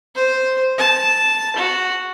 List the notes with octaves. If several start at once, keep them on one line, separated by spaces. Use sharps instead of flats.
C5
A5
F#4